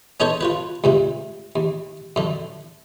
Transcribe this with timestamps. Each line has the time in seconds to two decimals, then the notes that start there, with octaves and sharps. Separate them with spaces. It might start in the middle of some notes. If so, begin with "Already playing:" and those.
0.20 B3 C#4 D#4 A4 C5 C#5
0.41 F4 F#4 B4
0.84 C#2 G2 C3
1.56 D#2
2.16 F#2 D3